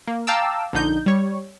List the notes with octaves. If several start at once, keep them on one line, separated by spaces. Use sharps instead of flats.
A#3
F5 G5 A5 A#5 D6 E6
A#1 D3 D#4 G6
G3 C#5